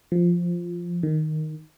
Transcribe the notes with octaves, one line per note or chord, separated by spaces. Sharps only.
F3
D#3